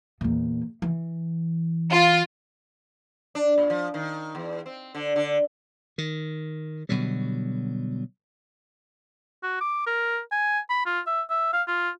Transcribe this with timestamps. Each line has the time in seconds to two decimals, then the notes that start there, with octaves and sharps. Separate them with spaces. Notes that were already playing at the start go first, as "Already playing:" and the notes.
0.21 E2 A#2
0.82 E3
1.92 F4
3.35 D4
3.58 A#2
3.70 F3
3.94 D#3
4.35 E2
4.66 C4
4.95 D3
5.16 D3
5.98 D#3
6.89 B2 D3 F#3 G3
9.43 F#4
9.61 D6
9.87 A#4
10.32 G#5
10.70 B5
10.86 F4
11.06 E5
11.30 E5
11.53 F5
11.68 F4